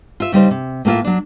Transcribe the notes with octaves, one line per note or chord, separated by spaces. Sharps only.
F4 E5
C#3 G3 D#4 C5
C3
A2 A#3 F4 E5
F#3 D4